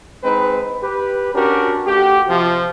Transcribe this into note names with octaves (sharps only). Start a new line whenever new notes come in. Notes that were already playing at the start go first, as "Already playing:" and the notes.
G#3 C4 D#4 B4
G4 B4
C#4 D4 F#4 G4 A#4
A3 F#4 G4
C3 F3